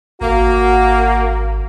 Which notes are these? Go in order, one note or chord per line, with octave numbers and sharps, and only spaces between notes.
G#1 A#3 F#4